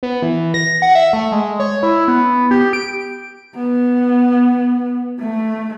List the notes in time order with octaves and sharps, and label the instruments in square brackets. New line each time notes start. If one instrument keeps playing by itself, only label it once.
[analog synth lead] B3
E3
A#6
F#5
E5
A3
G#3
C#5
E4
B3
G4
D7
[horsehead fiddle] B3
A3